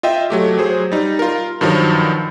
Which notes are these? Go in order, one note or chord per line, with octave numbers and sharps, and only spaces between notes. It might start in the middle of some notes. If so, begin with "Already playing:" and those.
F4 D#5 E5 G5
F#3 A3 G4
F#3 G#4 C5
G3 D#4
F4 A#4
G2 D#3 F3 F#3